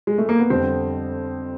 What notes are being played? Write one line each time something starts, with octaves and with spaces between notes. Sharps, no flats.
G#3
A3
A#3
B3
F2 D3 G3 C4